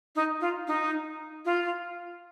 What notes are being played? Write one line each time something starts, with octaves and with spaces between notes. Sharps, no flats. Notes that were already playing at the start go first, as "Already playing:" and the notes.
D#4
F4
D#4
F4